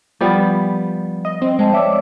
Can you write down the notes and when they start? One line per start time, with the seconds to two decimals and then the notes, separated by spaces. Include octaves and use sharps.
0.21 F3 G3 B3
1.25 D#5
1.42 C4 D#5
1.59 G#3 C5 G5 A5
1.74 C#5 D5 E5 D6